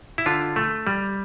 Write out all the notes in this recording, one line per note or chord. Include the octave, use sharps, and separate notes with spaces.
E4
D3 F4
A3
G3